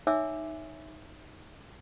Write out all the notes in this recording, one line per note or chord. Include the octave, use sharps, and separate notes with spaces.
D#4 C#5 E5 G#5 D6 E6